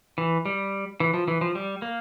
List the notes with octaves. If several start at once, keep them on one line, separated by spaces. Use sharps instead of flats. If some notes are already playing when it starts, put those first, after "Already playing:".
E3
G3
E3
F3
E3
F3
G3
A#3